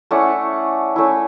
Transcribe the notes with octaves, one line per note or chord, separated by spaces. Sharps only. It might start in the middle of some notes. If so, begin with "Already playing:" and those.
A3 C#4 E4 D5 F#5
A3 C#4 E4